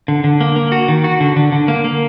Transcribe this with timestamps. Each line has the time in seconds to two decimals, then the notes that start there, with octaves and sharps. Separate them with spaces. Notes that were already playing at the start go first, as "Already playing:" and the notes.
0.08 D3
0.24 D3
0.41 A#3
0.56 A#3
0.72 F#4
0.89 D#3
1.04 F#4
1.20 D3
1.36 D3
1.52 D3
1.68 A#3
1.84 A#3